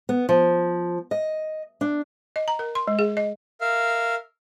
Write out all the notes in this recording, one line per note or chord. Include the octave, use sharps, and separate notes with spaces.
B3
F3
D#5
D4
D#5
A#5
A#4
C6
G#3
G#4
D#5
A#4 E5 F5